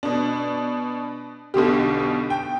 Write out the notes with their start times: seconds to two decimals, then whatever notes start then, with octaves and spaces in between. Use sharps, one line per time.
0.03 B2 D4
1.54 B1 B2 D3 G4
2.30 G5